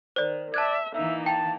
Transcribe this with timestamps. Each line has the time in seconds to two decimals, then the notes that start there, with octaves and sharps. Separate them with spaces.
0.16 D#3 C5 D5
0.54 D5 E5 A5 F#6 G#6
0.94 E3 A#3 D#4 E5
1.26 G5 A5